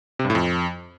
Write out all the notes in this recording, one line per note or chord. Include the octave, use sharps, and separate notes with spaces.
C3
G2
A2
F2